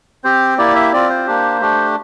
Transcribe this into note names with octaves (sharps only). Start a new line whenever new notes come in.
C4 G4 C5
A#3 E4 G4 D5
E5
C4 F4 D5
C5
A#3 D4 G4
A3 D4 G4